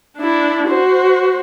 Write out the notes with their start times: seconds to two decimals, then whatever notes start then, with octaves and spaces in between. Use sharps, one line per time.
0.17 D4 E4
0.68 F#4 C5